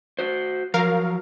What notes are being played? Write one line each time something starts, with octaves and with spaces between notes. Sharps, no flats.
F#4 C5
F3 F#3 A#4 F5